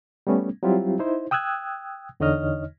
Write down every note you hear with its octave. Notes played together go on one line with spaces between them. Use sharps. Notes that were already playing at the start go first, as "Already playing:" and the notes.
G3 A3 B3 C#4
F#3 G3 C4 E4 F4 G4
D#4 E4 C5
G5 D#6 E6 F#6 G#6
E2 D3 D#4 C#5 D#5 F6